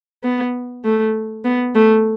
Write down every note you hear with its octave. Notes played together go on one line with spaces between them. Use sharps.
B3
A3
B3
A3